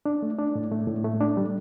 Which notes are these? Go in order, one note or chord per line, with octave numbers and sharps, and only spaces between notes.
D4
A3
D4
A2
A3
A2
A3
D4
G3